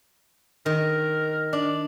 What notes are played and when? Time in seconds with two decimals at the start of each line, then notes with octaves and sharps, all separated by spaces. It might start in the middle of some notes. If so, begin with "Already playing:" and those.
0.66 D#3 A#4
1.53 D4 D5